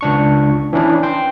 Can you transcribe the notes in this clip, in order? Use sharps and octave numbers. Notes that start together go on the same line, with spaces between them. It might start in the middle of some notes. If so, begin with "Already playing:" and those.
C#2 D4 C#6
E3 C#4 D4 E4
G5 C6